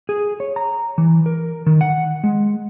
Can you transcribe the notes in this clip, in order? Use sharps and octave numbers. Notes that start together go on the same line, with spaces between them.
G#4
C#5
A#5
E3
A#4
D#3
F#5
G#3